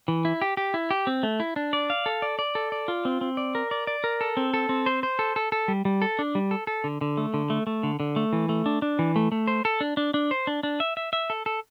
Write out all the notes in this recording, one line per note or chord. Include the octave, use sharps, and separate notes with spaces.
E3
E4
G4
G4
E4
G4
C4
A3
E4
D4
D5
F5
A4
D5
D5
A4
D5
F4
C4
C4
D5
A#4
D5
D5
A#4
A4
C4
A4
C4
C5
C5
A4
A4
A4
G3
G3
A4
D4
G3
A4
A4
D3
D3
A3
D3
A3
A3
D3
D3
A3
E3
A3
D4
D4
E3
A3
A3
C5
A4
D4
D4
D4
C5
D4
D4
E5
E5
E5
A4
A4